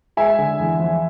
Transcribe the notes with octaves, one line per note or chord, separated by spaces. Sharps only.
G#3 E5 G#5
D3
E2
F3